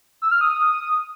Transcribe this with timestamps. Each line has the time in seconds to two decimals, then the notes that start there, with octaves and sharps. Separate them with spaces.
0.22 E6
0.31 F6
0.41 D#6